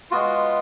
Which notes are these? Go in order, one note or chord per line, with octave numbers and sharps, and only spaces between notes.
G#3 B3 F4 F#4